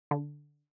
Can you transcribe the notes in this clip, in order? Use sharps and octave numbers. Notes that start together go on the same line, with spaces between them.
D3